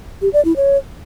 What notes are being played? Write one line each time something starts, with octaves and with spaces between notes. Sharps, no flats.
G4
D5
E4
C#5